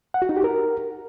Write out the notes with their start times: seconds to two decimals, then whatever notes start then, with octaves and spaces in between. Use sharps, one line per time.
0.14 F#5
0.22 F#4
0.29 D#4
0.37 G4
0.44 A#4